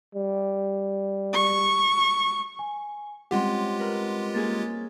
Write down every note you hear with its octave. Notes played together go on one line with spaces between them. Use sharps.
G3
C#6
G#5
G3 G#3 C4 C#4 F4 G4 F#5 C6
A#4 B4
A#3 C#4 G#4 A6